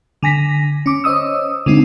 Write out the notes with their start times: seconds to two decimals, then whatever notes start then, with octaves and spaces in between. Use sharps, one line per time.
0.23 D3 G#5 A#6 B6
0.86 C#4 D6
1.04 C5 C#5 D#5 D#6 E6
1.66 D3 G#3 C4 D#4